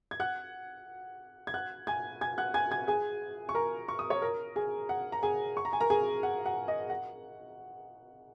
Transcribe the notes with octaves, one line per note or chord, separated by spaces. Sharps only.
G#6
F#5 F#6
G#6
F#5 F#6
G#5 G#6
G#5 G#6
F#5 F#6
G#5 G#6
G#5 G#6
G#4 G#5
C#6
A#4 A#5
C#6
D#6
C#5 C#6
A#4 A#5
G#4 G#5
F#5
A#5
G#4 G#5
C#6
A#5
G#5
A#4 A#5
G#4 G#5
F#5
F#5
D#5
F#5